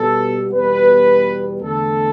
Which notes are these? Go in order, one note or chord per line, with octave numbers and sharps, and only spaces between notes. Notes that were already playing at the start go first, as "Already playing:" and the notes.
Already playing: B2 G3 B3 A4
E2 B2 G3 B3 B4
E2 D3 A3 A4